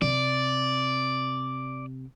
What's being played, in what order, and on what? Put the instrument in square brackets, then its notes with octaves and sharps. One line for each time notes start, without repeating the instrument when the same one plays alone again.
[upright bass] C3 [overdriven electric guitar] D5